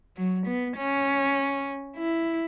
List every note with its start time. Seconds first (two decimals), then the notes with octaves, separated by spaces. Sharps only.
0.17 F#3
0.46 B3
0.77 C#4
1.96 E4